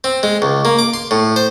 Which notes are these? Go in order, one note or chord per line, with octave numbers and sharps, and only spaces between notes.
C4
G#3
C#2
A#3
D6
C6
A2
C5